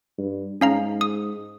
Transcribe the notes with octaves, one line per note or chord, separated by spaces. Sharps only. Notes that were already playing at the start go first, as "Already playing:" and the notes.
G2
G#2 C#4 F5 A#5
D#6